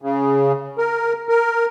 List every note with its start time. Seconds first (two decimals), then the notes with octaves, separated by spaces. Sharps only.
0.02 C#3
0.78 A#4
1.29 A#4